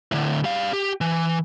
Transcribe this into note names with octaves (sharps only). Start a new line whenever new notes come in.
A2 D3
G3 F5
G4
E3